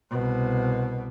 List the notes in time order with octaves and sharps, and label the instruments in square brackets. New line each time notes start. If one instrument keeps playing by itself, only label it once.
[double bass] C2 B2